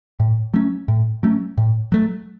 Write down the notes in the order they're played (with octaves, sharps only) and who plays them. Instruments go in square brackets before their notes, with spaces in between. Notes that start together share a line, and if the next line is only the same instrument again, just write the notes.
[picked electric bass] A2
F#3 A3 C#4
A2
F#3 A3 C#4
A2
F#3 A3